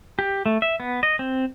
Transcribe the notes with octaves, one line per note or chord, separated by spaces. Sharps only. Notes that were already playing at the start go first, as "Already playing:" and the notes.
G4
A3
E5
B3
D#5
C4